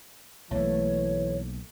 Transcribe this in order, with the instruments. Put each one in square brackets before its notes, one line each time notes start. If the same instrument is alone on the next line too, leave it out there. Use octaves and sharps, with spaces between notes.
[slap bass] B1 A#3 [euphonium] E3 [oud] A3 [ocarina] C#5